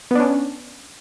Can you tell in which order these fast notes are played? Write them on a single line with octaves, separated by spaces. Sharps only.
B3 D4 C#4